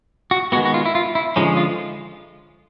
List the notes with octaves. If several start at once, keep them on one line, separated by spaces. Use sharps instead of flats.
F#4
D#3 G#3 B3 F#4
F#4
F4
E4
F4
E4
D3 F3 G#3 C#4 D#4
F4